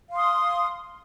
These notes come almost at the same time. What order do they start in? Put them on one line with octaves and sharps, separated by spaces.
F5 C6 D#6